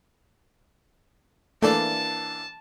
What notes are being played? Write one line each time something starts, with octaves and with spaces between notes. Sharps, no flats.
E3 A3 A#3 D4 A4 D5 A5